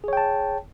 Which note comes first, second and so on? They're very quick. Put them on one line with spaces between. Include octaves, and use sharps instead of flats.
G#4 C#5 G5 A5